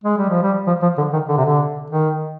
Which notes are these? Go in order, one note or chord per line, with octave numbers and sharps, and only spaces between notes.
G#3
G3
F3
G3
F3
F3
D3
D#3
D3
C3
D3
D#3